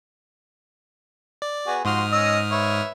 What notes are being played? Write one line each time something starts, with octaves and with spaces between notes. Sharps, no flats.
D5
B3 F#4 G#4
G#2 F3 F#4 C6 D#6 F6
C#4 D#5 E6
B4 C#5 E5